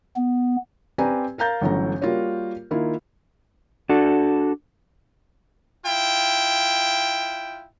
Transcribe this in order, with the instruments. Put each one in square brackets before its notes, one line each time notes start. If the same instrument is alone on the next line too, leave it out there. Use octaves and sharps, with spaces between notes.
[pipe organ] B3
[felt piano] C4 G4 B4 D5 G#5 A#5
A#4 F5 A#5 G6 A6
G1 E3 F#3 A3 C#4 A#5
G3 A#3 F4 F#4 A#4 C#5
D#3 A#3 E4 F4
[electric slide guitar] D4 F#4 A4
[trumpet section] E4 F4 G5